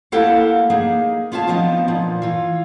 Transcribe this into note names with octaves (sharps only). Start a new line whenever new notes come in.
A#3 E4 G4 A4 F5 F#5
A#3 D#4 G#4
B3 F4 C#5 F5 A5
F3 B3 C4 D4 D#4 F4
A#2 F3
E3 F4